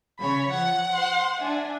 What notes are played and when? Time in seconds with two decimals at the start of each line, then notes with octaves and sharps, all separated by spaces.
0.19 C#3 C#5 B5
0.51 F3 F#5
0.90 C5 C6
1.37 D4 E5 G#5